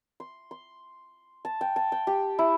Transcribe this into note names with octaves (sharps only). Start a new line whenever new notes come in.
C6
C6
A5
G5
A5
G5
G4
E4